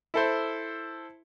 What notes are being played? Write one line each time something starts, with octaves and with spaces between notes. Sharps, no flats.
E4 A4 C5